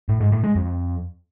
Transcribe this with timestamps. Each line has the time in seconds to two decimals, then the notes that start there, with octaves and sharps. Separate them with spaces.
0.09 A2
0.20 G#2
0.32 A2
0.44 G#3
0.55 F2